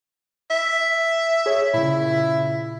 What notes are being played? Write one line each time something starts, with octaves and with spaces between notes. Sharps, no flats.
E5
G#4 C#5
A#2 C#3 E4